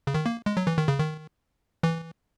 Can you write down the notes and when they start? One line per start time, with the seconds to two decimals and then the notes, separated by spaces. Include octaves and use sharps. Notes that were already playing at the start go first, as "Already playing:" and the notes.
0.07 C#3
0.14 D#3
0.26 A#3
0.46 G#3
0.57 F#3
0.67 E3
0.78 D#3
0.88 C#3
0.99 D#3
1.83 E3